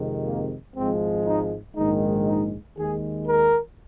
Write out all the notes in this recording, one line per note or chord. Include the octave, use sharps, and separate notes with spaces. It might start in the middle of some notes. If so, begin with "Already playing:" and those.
Already playing: F2 C3 D#3 G#3
A#3
G#1 G#2 F3 G#3 C4
D#4
A#1 G#2 D#3 G#3 D#4
D#4
D#2 D#3 G#3 G#4
A#4